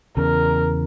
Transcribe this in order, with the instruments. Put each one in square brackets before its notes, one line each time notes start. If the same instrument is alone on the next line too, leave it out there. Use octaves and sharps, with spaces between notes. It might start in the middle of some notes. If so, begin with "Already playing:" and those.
[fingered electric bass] E2 C#3 [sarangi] A#4